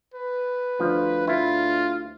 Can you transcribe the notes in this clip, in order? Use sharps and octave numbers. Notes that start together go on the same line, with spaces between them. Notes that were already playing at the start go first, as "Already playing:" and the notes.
B4
D2 F3
E4 F4